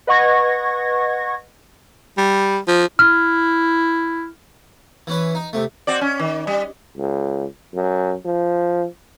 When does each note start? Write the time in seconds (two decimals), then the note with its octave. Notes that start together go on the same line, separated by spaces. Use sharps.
0.07 B4 D#5 F#5 C#6 G#6 A#6
2.18 G3
2.68 F3
2.99 E4 F6
5.07 E3 C#4 B4
5.35 D#4
5.53 C3 A3
5.87 C4 F#4 D5
6.01 C#4
6.19 D#3
6.47 G3
6.97 C#2
7.74 F#2
8.25 F3